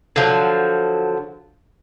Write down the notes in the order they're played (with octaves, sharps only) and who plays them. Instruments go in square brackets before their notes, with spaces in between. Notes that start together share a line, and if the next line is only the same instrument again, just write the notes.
[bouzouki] D3 F3 F#3